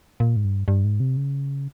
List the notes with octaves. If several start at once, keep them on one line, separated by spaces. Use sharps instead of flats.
A#2
G#2
G2
G2
G#2
C3
C#3